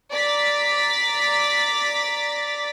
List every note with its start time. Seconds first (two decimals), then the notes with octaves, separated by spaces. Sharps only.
0.12 D5 A#5 D6 A6 B6